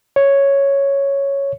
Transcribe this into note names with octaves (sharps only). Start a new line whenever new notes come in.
C#5